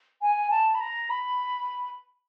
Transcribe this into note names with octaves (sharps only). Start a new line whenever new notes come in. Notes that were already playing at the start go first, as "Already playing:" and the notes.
G#5
A5
B5
A#5
B5